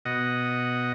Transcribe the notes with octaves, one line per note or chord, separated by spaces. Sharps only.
B2 D#5 F#5